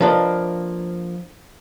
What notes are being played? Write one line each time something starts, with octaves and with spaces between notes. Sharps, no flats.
F3 A#3 D4 B4 D#5